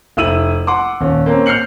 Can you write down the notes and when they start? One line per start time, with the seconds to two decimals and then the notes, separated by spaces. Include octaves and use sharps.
0.17 F1 E4 E6 D#7 F#7
0.67 F#5 C6 D6
1.01 D#1 C#4
1.26 A#3 C4 C#4
1.46 F6 G6 C7 C#7 F#7